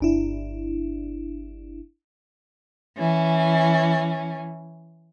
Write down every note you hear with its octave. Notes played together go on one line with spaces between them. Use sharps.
G1 D4 E4
E3 C#4